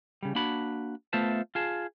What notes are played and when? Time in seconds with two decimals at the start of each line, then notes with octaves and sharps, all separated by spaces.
0.23 C#3 G3
0.35 A#3 D4 F#4 B5
1.13 A3 B3 F4 C5 E5 A5
1.55 F4 G#4 A5